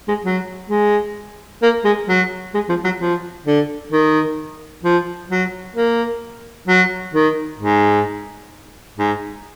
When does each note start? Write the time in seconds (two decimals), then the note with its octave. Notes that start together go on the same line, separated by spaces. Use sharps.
0.08 G#3
0.24 F#3
0.69 G#3
1.62 A#3
1.84 G#3
2.08 F#3
2.54 G#3
2.69 F3
2.84 F#3
3.00 F3
3.46 D3
3.92 D#3
4.83 F3
5.30 F#3
5.76 A#3
6.68 F#3
7.14 D#3
7.60 G#2
8.98 G#2